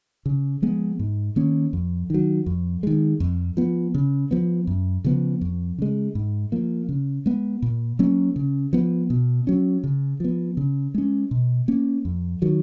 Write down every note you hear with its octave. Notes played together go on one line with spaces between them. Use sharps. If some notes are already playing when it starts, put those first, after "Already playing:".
C#3
F3 G#3 B3
G#2
D#3 A#3 C#4
F2
D#3 F#3
F2
D#3 G#3
F2
F3 B3
C#3
F3 B3
F#2
C#3 F3 B3
F2
C#3 G#3
G#2
F3 A#3
C#3
G#3 B3
A#2
F#3 A#3 C#4
C#3
F3 B3
B2
F#3 C#4
C#3
F3 B3
C#3
G#3 C#4
B2
A#3 C#4
F2
D#3 F#3